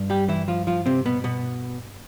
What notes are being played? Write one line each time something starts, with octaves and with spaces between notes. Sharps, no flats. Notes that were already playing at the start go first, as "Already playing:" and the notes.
Already playing: G2
G3 G4
E3 E4
F3 F4
F3 F4
C3 C4
B2 B3
B2 B3